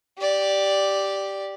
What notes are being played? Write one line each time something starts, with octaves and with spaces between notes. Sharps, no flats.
G4 D5